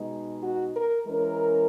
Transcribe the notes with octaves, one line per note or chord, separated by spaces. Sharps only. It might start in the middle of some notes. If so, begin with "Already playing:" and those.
Already playing: B2 G#3 D#4
F#4
A#4
E3 G#3 C#4 A#4